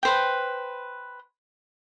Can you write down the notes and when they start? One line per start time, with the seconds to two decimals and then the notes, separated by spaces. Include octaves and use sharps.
0.03 B4 C5 G5